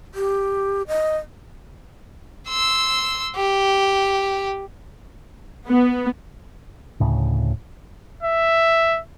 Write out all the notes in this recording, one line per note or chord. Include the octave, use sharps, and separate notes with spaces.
G4
D#5
C6 E6
G4
B3
D2 A2 C#3
E5